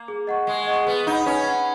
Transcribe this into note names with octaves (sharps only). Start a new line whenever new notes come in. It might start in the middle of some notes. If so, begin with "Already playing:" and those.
Already playing: A#3
G#4
D#5 F#5 C#6
G#3 G#4
D#5 F#5 C#6
B3 B4
D#4 F#5 B5
C#4 B4
F#5 B5